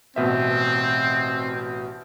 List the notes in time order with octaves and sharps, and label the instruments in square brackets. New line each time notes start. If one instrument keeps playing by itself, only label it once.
[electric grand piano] A1 B2 E5 [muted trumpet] C4